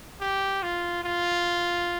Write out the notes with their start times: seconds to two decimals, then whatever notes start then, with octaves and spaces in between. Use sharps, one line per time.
0.21 G4
0.63 F4
1.04 F4